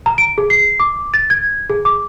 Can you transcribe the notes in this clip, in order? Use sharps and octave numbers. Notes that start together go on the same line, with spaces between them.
A#5
D7
G#4
C7
D6
A6
G#6
G#4
D6